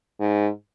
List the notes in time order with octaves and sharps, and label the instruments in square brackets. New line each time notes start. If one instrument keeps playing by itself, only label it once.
[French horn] G#2